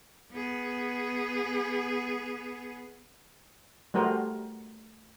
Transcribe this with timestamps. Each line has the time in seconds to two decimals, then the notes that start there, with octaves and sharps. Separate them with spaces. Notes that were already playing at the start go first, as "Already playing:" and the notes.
0.31 B3 G#4
3.94 G3 A3 F#4 A#4 C5